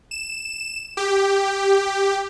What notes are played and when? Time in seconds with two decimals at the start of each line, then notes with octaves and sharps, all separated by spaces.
0.11 E7
0.97 G4